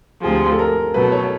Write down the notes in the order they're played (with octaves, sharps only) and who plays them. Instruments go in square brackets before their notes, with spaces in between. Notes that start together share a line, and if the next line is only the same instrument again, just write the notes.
[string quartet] D2 C3 F3 [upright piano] G#4
[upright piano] A4
A#4
[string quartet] B2 F#3 A3 [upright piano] B4
[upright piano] C#5